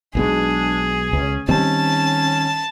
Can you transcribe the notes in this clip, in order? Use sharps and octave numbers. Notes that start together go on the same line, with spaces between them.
B1 B2 G#3 D4 G#4
C#2 C#4
D#3 G3 C4 C#4 A5